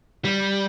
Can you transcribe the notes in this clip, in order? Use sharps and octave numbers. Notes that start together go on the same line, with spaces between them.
G3